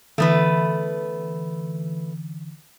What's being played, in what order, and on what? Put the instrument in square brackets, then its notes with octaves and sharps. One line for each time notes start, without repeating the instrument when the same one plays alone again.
[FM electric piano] D3 E3 [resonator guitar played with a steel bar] A3 B3 B4